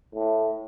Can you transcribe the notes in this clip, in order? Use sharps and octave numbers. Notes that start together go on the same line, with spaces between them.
A2